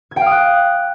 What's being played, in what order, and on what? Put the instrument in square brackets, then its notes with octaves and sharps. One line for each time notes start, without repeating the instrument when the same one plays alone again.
[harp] G#6
G5
F5
D#6
F#6